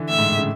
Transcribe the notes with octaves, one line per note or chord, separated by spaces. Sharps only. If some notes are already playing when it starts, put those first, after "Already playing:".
Already playing: D3 E3
A2 E5
G#2
A2
C#3